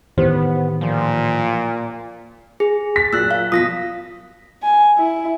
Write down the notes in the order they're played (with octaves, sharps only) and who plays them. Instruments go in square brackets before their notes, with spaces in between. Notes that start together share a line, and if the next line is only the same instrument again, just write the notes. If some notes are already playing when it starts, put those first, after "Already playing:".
[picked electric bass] A2 D#3 E3 [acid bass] B3 [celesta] G4 C5
[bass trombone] A#2 [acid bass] F3
[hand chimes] G#4
[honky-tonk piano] A6 B6
[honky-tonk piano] A#2 F#3 [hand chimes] E6 F#6
[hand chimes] F5
[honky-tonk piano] B2 F3 [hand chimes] D#6 A#6 B6
[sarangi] G#5
E4